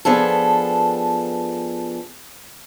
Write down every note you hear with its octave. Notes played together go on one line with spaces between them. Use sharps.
F3 B3 D4 G#4 A4